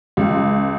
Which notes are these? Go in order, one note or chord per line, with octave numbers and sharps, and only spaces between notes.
C#2